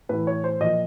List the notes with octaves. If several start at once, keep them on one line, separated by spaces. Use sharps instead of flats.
A2 E3 B4
C#5
C5
A#2 F3 D#5